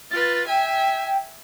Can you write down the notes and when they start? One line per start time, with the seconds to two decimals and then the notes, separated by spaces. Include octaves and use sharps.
0.11 F4 B4 A6
0.47 E5 G5 G#5